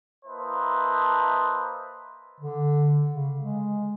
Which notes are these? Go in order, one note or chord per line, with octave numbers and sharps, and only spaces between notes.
A#3 E4 B4 C5 D#5 A5
D3
C#3
G#3